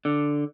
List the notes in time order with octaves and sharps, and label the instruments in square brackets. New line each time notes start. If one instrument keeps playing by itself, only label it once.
[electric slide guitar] D3